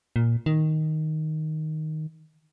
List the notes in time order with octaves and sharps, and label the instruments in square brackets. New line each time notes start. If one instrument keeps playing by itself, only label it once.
[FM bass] A#2
D#3